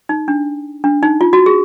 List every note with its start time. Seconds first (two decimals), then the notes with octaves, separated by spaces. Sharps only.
0.09 D#4
0.28 D4
0.84 D4
1.03 D#4
1.21 F4
1.33 F#4
1.46 G#4